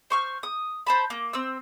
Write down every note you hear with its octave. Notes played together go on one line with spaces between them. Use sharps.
C5 C#6 F6
D#6
C5 A5 B5
A#3
C4 E6